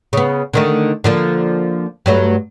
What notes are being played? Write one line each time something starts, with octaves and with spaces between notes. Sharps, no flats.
C#3 B3
D3 D#3 A3
D3 F3 A#3
G2 F#3 A3